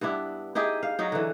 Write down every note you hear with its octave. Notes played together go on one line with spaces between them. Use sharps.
G2 B3 D4 E4
D#4 E4 G4 G#4
F5
F#3 D#4
D3 E3